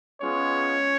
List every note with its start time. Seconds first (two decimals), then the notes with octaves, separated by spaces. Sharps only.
0.21 G#3 B3 C#4 F4 C#5